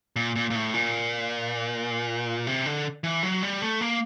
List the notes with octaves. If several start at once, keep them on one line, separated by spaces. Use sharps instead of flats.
A#2
A#2
A#2
A2
A#2
C3
D3
E3
F#3
G3
A3
A#3